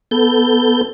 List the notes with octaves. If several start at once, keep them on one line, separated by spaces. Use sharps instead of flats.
B3 A4 G6